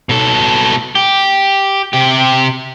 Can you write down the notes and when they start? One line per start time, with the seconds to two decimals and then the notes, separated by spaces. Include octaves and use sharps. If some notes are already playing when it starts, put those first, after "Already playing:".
0.09 B2 A4
0.95 G4
1.93 C3 G4